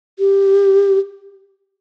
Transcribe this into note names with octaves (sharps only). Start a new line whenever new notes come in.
G4